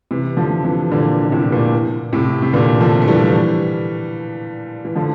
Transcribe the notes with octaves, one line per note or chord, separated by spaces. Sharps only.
C3 E3
D3 F3
C3 E3
A#2 D3
D3
A2 C3
A#2
A2 C3
C3
A#2 D3
D3 F3
A3
E3 G3
E3
D3 F3